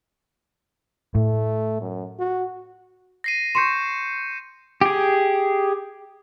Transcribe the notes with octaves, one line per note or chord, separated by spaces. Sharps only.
A2 A3
F#2
F#4
A#6 C7 D#7
C6 C#6 G6 C7 C#7 E7
G4 G#4